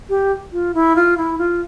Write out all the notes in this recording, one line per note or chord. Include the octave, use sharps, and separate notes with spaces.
G4
F4
E4
F4
E4
F4